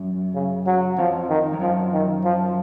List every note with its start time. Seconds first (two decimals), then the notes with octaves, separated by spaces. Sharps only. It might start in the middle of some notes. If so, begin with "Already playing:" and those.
Already playing: F#2
0.35 C#3
0.67 F#3
0.98 F2 F3
1.30 D#3
1.54 F2
1.61 F#2 F3
1.93 D#3
2.24 F3